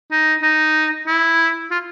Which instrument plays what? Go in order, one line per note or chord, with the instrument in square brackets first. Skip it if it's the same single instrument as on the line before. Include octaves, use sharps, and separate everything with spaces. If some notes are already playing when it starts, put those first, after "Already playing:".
[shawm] D#4
D#4
E4
F4